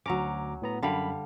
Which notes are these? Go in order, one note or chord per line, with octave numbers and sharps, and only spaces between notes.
D2 F#3 C#4 A#5 D6
A2 B3 A#5
F#2 D3 G3 F5 B5